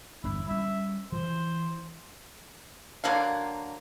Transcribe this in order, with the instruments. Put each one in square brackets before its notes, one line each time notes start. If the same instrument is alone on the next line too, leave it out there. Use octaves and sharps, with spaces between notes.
[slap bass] G1 E2 D4 [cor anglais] E4
[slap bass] G3 C#4 [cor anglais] E5
[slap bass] E3 [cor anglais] C5
[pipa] D3 F#3 A#3 F5